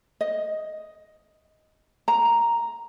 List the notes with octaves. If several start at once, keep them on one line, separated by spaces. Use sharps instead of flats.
D#5
A#5